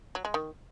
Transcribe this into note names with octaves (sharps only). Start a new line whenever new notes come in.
F#3
G#3
D#3